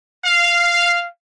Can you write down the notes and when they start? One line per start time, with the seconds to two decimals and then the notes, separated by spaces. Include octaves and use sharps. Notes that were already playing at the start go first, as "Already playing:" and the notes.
0.25 F5